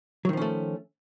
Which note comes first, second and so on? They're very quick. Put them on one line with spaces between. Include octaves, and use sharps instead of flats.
F#3 D#3 F3 C#4 A3